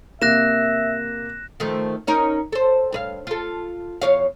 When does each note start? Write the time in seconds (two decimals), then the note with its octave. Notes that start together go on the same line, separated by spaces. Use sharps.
0.22 C3 A#3 E5 F#6 A#6 E7
1.60 D#3 F3 A3
2.07 C#4 D#4 A#4
2.52 A4 C5
2.92 G2 B4 F5
3.27 F4 A4
4.01 E2 C#5 F5